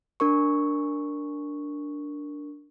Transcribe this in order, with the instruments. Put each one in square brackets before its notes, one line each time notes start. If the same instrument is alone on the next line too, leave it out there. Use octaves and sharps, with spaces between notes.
[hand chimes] D4 A#4 C#6